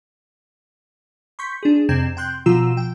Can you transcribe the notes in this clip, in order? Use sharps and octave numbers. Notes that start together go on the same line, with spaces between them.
C6 C#6 G6 B6
D4 G#4
F2 C3 C4 G#6 E7
G5 C6 F#6 G6
B2 F3 F4 A#5 E6 E7
G5